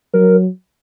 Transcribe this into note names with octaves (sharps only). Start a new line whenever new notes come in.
F#3 A#4